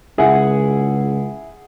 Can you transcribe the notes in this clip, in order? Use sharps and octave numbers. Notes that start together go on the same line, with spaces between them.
C#2 E4 G#4 F#5